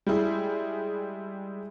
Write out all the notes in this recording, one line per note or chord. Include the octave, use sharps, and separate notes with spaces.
G3 G#3 E4 G#4